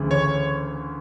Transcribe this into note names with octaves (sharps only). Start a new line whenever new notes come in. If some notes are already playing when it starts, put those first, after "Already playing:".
Already playing: D2 C#3 E3
C#5